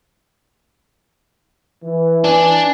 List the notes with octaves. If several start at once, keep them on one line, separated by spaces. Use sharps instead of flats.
E3
D4 G#5